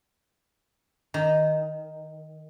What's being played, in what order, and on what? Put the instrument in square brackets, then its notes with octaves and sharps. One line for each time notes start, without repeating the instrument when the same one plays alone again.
[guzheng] D#3